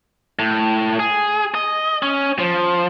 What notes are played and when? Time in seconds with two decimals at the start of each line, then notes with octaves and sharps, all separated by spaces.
0.39 A2
1.00 G#4
1.55 D#5
2.03 C#4
2.39 F3